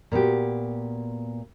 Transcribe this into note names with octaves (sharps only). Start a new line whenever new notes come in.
A#2 B3 F#4 G4